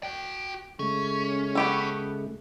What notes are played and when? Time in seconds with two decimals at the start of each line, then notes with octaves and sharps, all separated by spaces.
0.03 F#4 G5
0.79 C#3 G#3 A3 C#4
1.55 B3 G4 A4